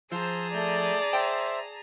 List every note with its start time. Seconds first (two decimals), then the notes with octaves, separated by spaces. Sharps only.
0.12 F3 G#4 C5 A5 A#5 E6 G6
0.54 A3 D5 G6
1.13 C5 E5 G5